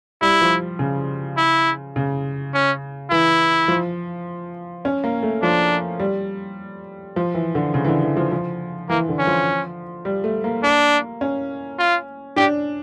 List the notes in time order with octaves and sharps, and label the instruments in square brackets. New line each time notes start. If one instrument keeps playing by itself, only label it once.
[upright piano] G3 [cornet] E4
[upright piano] F3
C#3
[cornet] E4
[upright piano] C#3
[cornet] C#4
[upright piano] E3 [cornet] E4
[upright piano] F3
C#4
A#3
A3
[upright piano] F3 [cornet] D4
[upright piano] G3
F3
E3
D3
C#3
E3
D3
E3
F3
F3
[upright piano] E3 [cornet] A#3
[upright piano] D3
[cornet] C#4
[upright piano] F3
G3
A3
A#3
[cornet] D4
[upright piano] C#4
[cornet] F4
[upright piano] D4 [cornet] G4